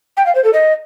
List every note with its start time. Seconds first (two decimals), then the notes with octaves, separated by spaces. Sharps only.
0.17 G5
0.26 F5
0.35 C5
0.44 A4
0.53 D#5